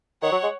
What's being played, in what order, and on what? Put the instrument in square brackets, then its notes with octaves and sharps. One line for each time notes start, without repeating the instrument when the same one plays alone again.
[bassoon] D#3 [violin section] C#5 F#5
[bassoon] F#3
G#3